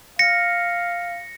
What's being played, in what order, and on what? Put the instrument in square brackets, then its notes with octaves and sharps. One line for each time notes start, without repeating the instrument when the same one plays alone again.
[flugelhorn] F5 [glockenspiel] A#6 C#7